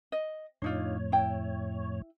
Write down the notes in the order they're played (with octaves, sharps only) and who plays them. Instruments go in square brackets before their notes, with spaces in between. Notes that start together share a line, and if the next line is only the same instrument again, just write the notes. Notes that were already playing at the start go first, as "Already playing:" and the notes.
[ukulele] D#5
[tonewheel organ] F2 A2 C#5 [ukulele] D4 D#4 F4
[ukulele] E4 G5